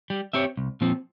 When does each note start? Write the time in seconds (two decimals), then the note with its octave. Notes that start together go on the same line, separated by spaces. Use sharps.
0.10 G3
0.33 C4 G4 C#5 E5
0.57 C2
0.81 A#2 F3 C4